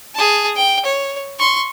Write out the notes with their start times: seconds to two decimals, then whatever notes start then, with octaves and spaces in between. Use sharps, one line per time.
0.15 G#4 A5
0.56 G5
0.85 C#5
1.39 C6 C#6